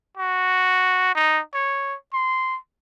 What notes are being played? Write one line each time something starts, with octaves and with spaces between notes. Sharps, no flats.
F#4
D#4
C#5
C6